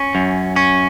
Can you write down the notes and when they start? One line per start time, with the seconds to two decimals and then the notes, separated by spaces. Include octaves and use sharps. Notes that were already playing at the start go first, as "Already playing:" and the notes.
Already playing: C#4
0.15 F#2
0.56 C#4